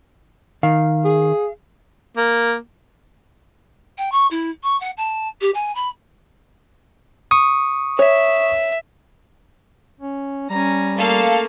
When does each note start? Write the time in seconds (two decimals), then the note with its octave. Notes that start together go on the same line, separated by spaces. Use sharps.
0.63 D#3 F5
1.05 G#4
2.17 A#3
3.98 G5
4.12 C#6
4.31 E4
4.63 C#6
4.80 F#5
4.97 A5
5.41 G4
5.54 G#5
5.75 B5
7.31 C#6 D#6
7.99 C#5 E5
10.01 C#4
10.50 G3 C#4 A#5
10.98 A3 A#3 A4 F5